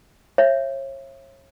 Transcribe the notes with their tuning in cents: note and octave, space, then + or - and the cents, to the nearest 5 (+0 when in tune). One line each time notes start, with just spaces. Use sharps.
C#5 -35 E5 +30